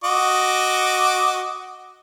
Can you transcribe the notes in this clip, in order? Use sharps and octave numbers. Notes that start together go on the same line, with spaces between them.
F#4 D#5 D6